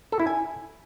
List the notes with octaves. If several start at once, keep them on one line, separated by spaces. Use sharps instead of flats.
A4
E4
G#5